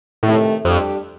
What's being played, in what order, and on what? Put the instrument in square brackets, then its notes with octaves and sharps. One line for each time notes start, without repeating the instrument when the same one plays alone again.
[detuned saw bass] A2 [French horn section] C3 D#3 A3
[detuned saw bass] F2 [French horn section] G3 D4 G4